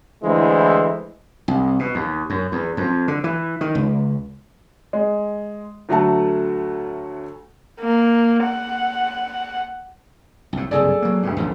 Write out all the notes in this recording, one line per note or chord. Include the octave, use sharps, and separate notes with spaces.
D2 E3 G#3 E4 C5
C2
B2
D#2
F#2
E2
F2
D3
E3
D#3
C#2
G#3
D2 F#3 A3 F#4 A5
A#3
F#5
C2 A2
F#1 C2 G2 G#4 A4 D5
F#3 A#3
G1 D2 G2
D#1 A1 F3